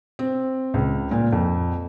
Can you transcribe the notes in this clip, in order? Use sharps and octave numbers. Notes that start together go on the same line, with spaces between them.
C4
C#2
A#2
F2